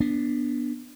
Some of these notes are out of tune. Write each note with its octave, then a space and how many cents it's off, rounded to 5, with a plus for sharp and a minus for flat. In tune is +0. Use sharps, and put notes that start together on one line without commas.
B3 -10 D4 +0